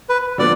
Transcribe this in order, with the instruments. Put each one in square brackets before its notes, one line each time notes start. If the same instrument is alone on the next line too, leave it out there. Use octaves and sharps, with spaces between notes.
[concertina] B4
[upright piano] D3 F3 B3 [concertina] D5